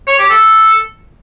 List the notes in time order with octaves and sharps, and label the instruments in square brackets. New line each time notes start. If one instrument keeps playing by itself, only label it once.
[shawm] C#5
G4
A4